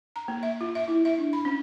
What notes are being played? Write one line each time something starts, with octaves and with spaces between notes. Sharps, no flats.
A#5
A#3
E5
F4
E5
E4
E5
D4
B5
C#4